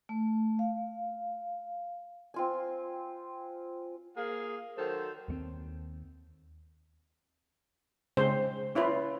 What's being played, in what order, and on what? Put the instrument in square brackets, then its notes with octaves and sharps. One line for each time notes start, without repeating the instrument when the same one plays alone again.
[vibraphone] A3
F5
[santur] C4 F4 G#5
[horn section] A#3 G#4 F5
D#3 F#3 A4 C5
[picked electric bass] D#2 A3 C4
[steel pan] C#3 G#3 C4 C5
C#4 E4 F4 B4